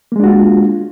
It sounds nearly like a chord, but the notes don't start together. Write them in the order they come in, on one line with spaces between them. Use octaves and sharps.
A#3 G#3 D4 F#4 F4